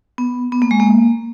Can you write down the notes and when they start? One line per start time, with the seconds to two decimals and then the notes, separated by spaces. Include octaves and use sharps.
0.18 B3
0.52 B3
0.62 A#3
0.71 G#3
0.80 A#3